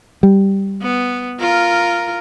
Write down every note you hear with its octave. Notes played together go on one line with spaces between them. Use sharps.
G3
B3
F4 A#4